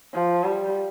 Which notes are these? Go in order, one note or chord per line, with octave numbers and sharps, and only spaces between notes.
F3
G3